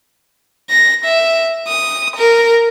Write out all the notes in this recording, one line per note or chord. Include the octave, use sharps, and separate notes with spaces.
A#6
E5
D#6
A#4